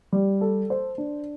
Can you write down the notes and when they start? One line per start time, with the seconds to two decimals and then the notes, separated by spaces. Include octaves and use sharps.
0.12 G3
0.41 A4
0.70 C5
0.98 D4